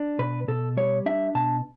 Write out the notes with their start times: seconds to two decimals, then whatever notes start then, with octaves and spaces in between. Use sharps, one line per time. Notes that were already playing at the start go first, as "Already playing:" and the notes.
Already playing: D4
0.19 B2 B4
0.48 B2 A4
0.77 G3 C#5
1.06 D4 E5
1.35 B2 A5